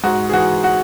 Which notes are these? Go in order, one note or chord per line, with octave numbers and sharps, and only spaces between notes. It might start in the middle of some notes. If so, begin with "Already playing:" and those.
G#2 F#4
G#4
E3 F#4
F#4